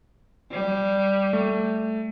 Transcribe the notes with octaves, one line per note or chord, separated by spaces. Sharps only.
G3
A3